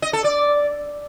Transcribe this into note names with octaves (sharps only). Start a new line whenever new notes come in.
D#5
A4
D5